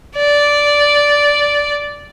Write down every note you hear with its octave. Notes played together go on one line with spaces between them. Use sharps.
D5